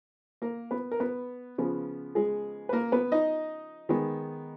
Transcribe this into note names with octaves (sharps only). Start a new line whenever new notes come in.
A#3 A#4
B3 B4
A#4
B3 B4
C#3 F3 B3
G#3 G#4
B4
A#3 A#4
B3 B4
D#4 D#5
D#3 G#3 B3